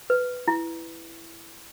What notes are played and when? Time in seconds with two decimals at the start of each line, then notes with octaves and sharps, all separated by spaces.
0.10 B4
0.48 E4